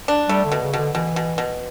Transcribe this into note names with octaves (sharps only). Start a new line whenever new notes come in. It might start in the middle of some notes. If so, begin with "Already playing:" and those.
D4
G3 A3
D3
B2
C#3
B2 D3
B2 E3
B2
B2